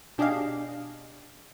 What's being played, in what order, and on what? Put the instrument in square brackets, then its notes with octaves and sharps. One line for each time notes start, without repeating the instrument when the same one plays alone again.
[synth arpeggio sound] B2 D4 G4 G#4 D#5 F5